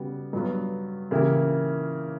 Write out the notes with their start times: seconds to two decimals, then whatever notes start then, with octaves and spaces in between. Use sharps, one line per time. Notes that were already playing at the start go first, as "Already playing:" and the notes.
Already playing: C#3 G3 B3 F#4
0.33 G2 F#3 B3
1.11 C#3 E3 A#3 E4 G4